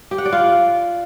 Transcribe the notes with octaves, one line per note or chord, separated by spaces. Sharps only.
G4
F#5
D5
F4